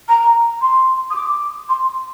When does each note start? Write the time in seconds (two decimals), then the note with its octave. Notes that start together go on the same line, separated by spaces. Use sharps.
0.09 A#5
0.62 C6
1.10 D#6
1.16 D6
1.69 C6